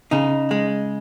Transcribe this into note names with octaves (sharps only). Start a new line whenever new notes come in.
C#3 D#4
G#3